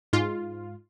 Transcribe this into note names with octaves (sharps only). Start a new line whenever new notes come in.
G#2 F4